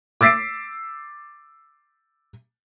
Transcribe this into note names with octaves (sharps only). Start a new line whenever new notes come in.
D6 E6 A6 B6 C7 D7